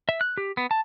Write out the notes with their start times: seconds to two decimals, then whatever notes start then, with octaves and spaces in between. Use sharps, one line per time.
0.09 E5
0.21 F#6
0.38 G4
0.57 B3
0.71 A5